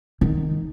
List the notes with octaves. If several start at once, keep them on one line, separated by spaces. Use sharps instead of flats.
D#3